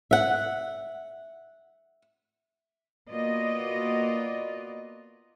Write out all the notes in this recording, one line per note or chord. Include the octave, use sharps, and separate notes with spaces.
E5 F#5
A#3 B3 F4 F#4 D5 D#5